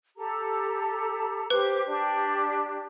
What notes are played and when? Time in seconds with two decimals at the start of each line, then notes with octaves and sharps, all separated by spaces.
0.17 G4 A4 A#5
1.50 G4 B4 C5 D6
1.87 D4 G4